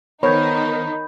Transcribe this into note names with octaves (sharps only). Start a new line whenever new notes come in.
D#3 B3 D#4 A#4 C5 C#5 B5 G6